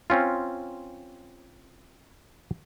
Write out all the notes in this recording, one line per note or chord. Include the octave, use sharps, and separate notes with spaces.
C4 C#4 F4